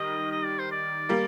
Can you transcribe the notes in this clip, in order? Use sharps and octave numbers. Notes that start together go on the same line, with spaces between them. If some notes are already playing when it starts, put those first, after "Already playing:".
Already playing: D#3 G3 D#5
D#5
D5
C5
D5
G3 A#3